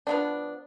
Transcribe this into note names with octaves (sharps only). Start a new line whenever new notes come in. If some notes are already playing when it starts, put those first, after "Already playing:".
F3 B3 D4